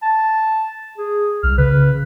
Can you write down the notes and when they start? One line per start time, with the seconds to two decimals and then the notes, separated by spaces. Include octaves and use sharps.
0.03 A5
0.98 G#4
1.43 C2 F6
1.58 C#3 B4